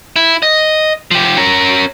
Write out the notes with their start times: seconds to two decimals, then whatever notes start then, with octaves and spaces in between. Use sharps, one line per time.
0.16 E4
0.42 D#5
1.11 F3 G4
1.37 C#4 A#4